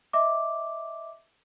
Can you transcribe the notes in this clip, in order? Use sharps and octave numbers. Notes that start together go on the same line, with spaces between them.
D#5 E5 D6